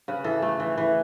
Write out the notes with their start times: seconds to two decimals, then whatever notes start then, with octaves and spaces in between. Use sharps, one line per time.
0.08 C#3 B4
0.24 E3 A4
0.42 A3
0.60 E3
0.78 E3